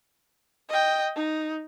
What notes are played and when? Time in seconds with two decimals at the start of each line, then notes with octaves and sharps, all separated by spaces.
0.69 D#5 G5
1.15 D#4